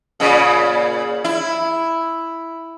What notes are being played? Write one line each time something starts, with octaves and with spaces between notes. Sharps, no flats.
A#2 C#3
E4